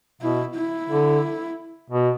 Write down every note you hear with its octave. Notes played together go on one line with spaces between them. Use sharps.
B2 E4
E4
D3
B2